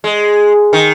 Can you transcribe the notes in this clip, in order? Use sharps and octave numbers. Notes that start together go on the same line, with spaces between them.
G#3
D#3